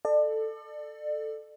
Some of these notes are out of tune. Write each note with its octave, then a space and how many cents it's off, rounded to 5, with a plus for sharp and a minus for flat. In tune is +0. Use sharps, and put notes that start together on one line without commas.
A4 +0 D5 +35